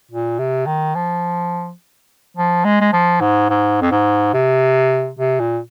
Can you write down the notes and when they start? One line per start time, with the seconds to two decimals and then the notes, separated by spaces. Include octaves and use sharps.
0.11 A#2
0.39 C3
0.67 D#3
0.95 F3
2.37 F3
2.65 G#3
2.81 G#3
2.93 F3
3.21 G#2
3.50 G#2
3.81 F2
3.91 G#2
4.34 C3
5.19 C3
5.40 A#2